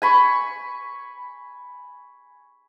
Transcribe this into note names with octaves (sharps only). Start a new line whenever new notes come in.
G#5 B5 C#6